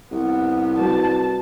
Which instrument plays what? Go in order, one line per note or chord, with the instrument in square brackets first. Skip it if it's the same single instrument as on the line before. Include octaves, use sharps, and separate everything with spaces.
[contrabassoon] C2 [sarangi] B3
[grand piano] G3 F#4 B4 [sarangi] A5